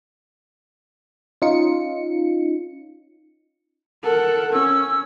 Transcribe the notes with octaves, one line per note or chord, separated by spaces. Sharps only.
C#4 D#4 F4 C#7
A4 A#4 F#5
C#4 E6